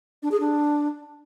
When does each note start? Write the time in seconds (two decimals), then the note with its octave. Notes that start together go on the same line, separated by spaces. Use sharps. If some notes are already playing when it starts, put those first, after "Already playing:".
0.23 D4
0.31 G#4
0.40 D4